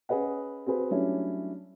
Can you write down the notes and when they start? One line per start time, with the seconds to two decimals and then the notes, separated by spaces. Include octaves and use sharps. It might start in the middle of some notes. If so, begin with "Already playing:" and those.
0.09 C#4 G#4 B4 D#5 F#5
0.66 C4 F#4 G#4 B4
0.91 F#3 G3 A3 C#4 D4 E4